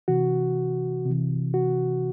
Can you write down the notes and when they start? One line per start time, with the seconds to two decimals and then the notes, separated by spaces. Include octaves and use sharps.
0.08 C3 E3 F#4
1.05 C3 E3
1.54 F#4